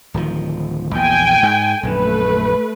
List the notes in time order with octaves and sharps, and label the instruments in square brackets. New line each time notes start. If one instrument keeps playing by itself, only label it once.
[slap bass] D1 D#3 F3
[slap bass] A#1 E2 A#2 [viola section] G5 G#5
[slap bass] G#2 G#3
[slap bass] A#1 F#2 D3 [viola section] A3 B4